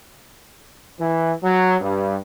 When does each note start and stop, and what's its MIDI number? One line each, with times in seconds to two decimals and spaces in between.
1.00 1.32 52
1.44 1.75 54
1.80 2.16 43